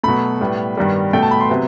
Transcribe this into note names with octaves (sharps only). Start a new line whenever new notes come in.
B2 F#3 A3 B5
A2 G3 B3
G2 D#3 G3 B3
B2 A3 G5
A5
B5
C6
C3 F#3 B3